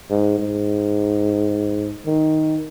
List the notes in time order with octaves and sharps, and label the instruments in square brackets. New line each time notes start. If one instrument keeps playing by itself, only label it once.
[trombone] G#2
G#2
D#3